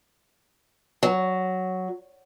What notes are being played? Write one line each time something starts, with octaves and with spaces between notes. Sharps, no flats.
F#3